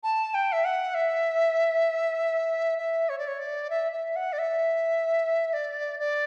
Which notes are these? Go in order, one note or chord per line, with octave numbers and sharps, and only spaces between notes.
A5
G5
E5
F#5
E5
E5
C#5
D5
C#5
D5
E5
E5
F#5
D5
E5
D5
D5